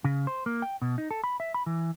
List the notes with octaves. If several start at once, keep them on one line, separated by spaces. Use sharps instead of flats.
C#3
C5
A#3
G5
B2
D#4
A4
B5
E5
B5
E3